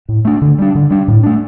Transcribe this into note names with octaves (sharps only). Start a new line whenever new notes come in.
A2
A3 D4
D3
G3 D4
D3
G3 D4
A2
A3 D4